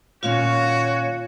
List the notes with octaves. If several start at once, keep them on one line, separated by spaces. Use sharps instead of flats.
D#2 A#2 C#4 F4 F#4 C#5 F5